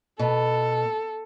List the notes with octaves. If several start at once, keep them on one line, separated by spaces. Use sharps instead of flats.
B2 A4